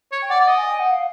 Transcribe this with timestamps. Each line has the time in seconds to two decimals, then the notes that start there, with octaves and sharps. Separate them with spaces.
0.12 C#5
0.22 G5
0.30 D5 F#5
0.40 D5
0.48 D#5
0.56 G#5
0.68 G5
0.79 F#5
0.91 F5